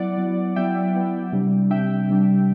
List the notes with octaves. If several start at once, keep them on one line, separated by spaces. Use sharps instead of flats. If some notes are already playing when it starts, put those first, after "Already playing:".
Already playing: F#3 B3 E4 D5 F#5
F#3 B3 E4
F#3 B3 E4 E5 G5
F#3 B3 E4
C3 G3 D4
C3 G3 D4 E5 G5
C3 G3 D4